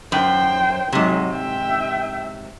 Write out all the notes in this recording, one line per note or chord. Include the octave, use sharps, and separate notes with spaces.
F#2 C5 G5
G#2 C3 F#3 G#3
E5 G5